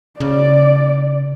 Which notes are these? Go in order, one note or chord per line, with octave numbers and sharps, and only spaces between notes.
C#3 D5